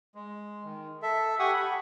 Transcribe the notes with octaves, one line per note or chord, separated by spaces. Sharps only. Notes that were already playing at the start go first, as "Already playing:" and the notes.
G#3
D#3
A4 E5
G4 F#5 G#5 C#6 D#6
B5